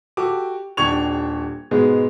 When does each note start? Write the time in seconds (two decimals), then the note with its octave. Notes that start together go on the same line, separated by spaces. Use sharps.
0.17 F#4 G4 A4 D6
0.77 D#1 D4 G4 C#6 G#6 F7
1.71 G#2 B2 G#3 B3 G#4